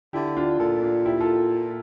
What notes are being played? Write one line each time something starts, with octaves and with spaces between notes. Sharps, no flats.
D3 E4 G4
D4 F4
A#2 F4 A4
D4 F4
E4 G4
F4 A4